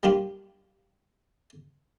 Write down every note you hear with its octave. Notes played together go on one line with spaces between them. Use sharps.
G3 A#3 D4 F4 G4